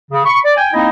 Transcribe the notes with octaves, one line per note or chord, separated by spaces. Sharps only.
C#3
B5 C#6
D5
G5 G#5
A#3 C4 D#4 E4 D#5